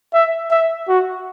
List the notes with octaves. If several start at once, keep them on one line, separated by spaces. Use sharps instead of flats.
E5
E5
F#4